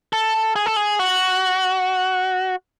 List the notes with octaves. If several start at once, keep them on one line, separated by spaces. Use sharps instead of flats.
A4
G#4
A4
G#4
F#4